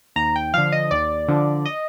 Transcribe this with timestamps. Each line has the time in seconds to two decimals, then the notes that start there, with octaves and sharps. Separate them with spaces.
0.16 D#2 A#5
0.36 G5
0.54 D3 F3 F5
0.72 D#5
0.91 D#2 D5
1.28 D3 F3
1.66 D#5